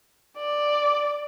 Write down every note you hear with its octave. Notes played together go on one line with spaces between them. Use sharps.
D5